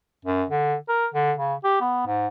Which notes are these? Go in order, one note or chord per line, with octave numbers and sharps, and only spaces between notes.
F#2
D3
A#4
D3
C#3
G4
B3
G#2